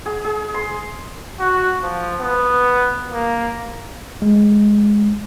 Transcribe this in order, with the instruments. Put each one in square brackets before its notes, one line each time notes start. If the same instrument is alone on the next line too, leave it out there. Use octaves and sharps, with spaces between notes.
[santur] G#4
G#4
C6
[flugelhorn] F#4
F3
B3
A#3
[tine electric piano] G#3